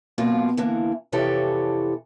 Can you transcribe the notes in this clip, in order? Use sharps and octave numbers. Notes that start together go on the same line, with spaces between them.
F#2 B2 A#3 F4
D3 E3 A#3
F2 C3 E3 G4 A4 C#5